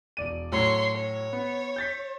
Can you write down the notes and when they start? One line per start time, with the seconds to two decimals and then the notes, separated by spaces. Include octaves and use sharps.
0.17 E1 D5 D#7
0.52 A2 F#3 C#5 C6
0.95 C#5
1.33 B3
1.76 G6 A6 B6